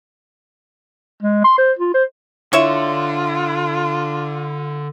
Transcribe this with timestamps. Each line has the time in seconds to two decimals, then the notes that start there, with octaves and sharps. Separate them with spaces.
1.23 G#3
1.44 C6
1.58 C5
1.79 F4
1.94 C5
2.53 D3 E4 F4 C#5 E5